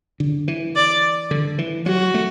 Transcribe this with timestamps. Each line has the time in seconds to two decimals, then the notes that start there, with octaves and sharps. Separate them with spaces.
0.20 D3
0.48 E3
0.76 D5
1.31 D3
1.58 E3
1.86 F#3 F#4
2.14 A3